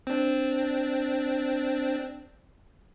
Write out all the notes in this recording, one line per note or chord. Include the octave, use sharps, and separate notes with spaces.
C4 D4